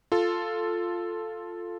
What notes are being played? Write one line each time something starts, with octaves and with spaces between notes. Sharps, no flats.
F4 A4